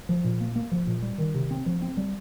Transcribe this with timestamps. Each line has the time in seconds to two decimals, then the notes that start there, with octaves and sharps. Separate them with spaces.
0.09 F3
0.24 A#2
0.40 A#3
0.56 A#3
0.72 F3
0.87 A#2
1.02 G3
1.18 D#3
1.34 C3
1.51 C4
1.66 F3
1.82 C4
1.97 G3